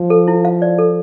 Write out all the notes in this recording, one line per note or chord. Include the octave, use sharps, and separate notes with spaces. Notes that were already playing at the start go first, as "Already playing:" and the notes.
Already playing: F3
A4
E4
F5
D5
A4